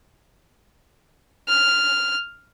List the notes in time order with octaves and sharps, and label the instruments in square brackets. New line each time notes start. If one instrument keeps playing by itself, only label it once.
[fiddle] F6